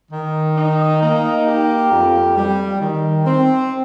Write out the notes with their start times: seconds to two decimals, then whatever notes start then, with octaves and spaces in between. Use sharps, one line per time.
0.12 D#3
0.56 D#4
1.01 A#3
1.47 G4
1.91 F2
2.36 G3
2.81 D#3
3.26 C4